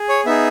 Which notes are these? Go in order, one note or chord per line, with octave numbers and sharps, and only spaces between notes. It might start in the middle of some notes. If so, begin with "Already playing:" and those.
Already playing: G#4
C#5
B3 D#4 G#4 E5